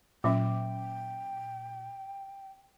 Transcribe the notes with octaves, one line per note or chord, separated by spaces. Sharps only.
A#2 F#3 C#4 C5 E5 G5 D6